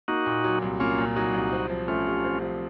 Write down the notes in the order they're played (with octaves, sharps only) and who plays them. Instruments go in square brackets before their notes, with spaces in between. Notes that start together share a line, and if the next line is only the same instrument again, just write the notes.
[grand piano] A#3 [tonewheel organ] D#4 F#4
[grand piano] A#2
F#3
C2
[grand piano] A#3 [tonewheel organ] C#4 F4
[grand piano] A#2
[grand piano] F#3 [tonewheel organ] D#4 F#4
[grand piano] C2
C4
F3
[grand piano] A3 [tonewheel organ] C#4 F4
[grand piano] C3
C4
F3